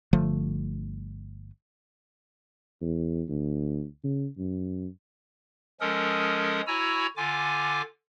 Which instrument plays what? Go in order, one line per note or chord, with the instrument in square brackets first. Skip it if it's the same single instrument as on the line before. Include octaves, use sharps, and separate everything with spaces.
[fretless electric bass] G1 D3 F3 A3
[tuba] E2
D2
C#3
F#2
[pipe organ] F3 G#3 C#4 A4 A#4 D#6
E4 F#4 C#5 G#5 A#5 E6
D3 F4 G#5 D6